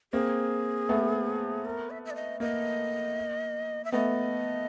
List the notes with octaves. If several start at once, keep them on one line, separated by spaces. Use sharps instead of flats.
A#3 C4 G#4
A3 B3
A#4
E5
E5
D5
D#5
A#3 D#5
E5
A3 B3 D#5